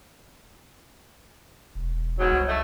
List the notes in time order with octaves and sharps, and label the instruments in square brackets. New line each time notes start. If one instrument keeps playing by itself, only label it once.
[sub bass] E1
[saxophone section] G#2 B2 F#3
[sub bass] C2
[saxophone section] A3 D#5